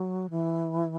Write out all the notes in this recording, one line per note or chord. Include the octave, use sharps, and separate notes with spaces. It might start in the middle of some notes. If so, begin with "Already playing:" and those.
Already playing: F#3
E3